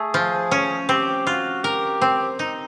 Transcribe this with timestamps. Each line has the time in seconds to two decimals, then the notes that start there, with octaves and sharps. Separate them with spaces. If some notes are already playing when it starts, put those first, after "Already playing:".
Already playing: A3 G#4
0.14 F3
0.51 C#4
0.89 C4 G4
1.27 F4 F#4
1.64 G4 A#4
2.02 C4
2.39 D#4